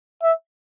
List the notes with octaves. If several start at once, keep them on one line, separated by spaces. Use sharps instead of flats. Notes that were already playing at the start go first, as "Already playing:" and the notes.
E5